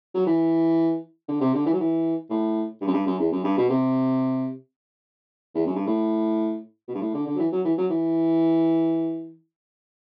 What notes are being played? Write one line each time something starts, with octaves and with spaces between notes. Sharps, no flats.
F#3
E3
D3
C3
D3
E3
F#3
E3
A2
G2
F#2
G2
F#2
E2
F#2
G2
B2
C3
E2
F#2
G2
A2
B2
G2
A2
D3
D3
F#3
E3
F#3
E3
F#3
E3